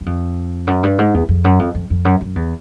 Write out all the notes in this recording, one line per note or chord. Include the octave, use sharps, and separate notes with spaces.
F#2
F2
F#2
G2
G#2
E2
F2
F#2
F2
F2
F2
F#2
F#2
E2